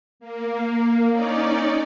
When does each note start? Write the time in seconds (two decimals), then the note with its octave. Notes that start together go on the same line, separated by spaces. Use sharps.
0.20 A#3
1.10 C#4 D#4 D5